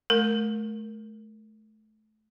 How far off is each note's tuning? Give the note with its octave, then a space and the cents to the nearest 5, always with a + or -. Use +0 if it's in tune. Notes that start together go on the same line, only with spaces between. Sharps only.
A3 -30 A#4 +5